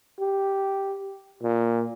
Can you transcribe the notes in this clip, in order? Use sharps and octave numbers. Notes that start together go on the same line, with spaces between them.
G4
A#2